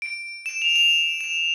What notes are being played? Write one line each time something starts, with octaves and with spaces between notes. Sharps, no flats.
D7
E7
F7
F7
E7